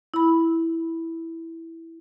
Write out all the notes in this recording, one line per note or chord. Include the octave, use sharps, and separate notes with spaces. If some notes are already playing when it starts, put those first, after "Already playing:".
E4 B5